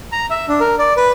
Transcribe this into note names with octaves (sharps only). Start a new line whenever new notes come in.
A#5
E5
D4
A#4
D5
B4